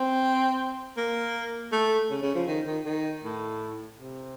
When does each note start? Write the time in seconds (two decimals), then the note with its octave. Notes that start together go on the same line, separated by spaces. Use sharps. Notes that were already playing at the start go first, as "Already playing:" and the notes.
Already playing: C4
0.97 A#3
1.72 A3
2.10 C#3
2.22 C#3
2.35 F3
2.48 D#3
2.66 D#3
2.85 D#3
3.23 A2
3.99 C3